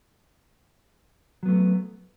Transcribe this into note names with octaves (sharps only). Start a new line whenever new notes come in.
F#3 A3 B3